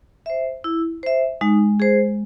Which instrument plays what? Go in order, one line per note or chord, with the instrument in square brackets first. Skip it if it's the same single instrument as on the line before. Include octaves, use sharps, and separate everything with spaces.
[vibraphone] C5 E5
E4
C5 E5
[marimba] G#3 [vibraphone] D#4
[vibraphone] G#4 C5